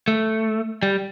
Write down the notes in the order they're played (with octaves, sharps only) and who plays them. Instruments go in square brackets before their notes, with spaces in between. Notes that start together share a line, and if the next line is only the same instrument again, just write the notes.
[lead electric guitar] A3
G3